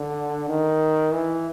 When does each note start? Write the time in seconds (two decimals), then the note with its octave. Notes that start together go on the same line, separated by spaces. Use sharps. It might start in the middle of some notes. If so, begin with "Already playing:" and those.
Already playing: D3
0.49 D#3
1.13 E3